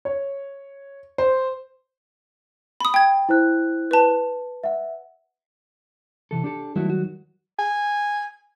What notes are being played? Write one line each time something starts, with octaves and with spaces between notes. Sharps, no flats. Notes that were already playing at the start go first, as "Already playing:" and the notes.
C#5
C5
B5 D#6
G5 G#6
E4 C5 F#6
B4 A5
E5 F#5
C3 E3 A4
D4 G4 A4
D#3 F#3 G3 A3 E4 F#4
F#4
G#5